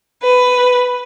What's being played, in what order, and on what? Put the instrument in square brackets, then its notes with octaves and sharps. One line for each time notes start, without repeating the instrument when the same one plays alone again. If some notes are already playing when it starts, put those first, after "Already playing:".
[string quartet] B4